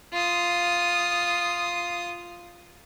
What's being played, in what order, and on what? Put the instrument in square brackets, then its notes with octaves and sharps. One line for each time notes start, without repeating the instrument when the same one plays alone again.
[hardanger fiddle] F4 D#6